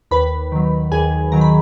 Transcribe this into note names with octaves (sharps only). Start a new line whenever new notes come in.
D#2 B4 B5
D#3 F#3
D#2 G#4 G#5
D#3 F#3 A#5
B5